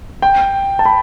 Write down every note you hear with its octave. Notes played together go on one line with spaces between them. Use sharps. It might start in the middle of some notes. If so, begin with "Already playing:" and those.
G5
A5
B5